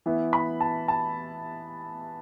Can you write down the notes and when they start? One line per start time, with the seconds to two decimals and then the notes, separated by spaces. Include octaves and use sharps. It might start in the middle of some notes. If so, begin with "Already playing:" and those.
0.06 E3 B3 E4
0.33 B5
0.61 A5
0.88 A5